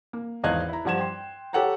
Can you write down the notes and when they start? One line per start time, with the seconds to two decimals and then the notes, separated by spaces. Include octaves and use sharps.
0.13 A#3
0.43 G#1 E2 D#5 F5 F#6 G#6
0.69 E4 A#5
0.85 G2 F3 F#5 G#6 E7
0.99 G5 C6
1.53 G4 A4 C#5 F#5 G5 A#5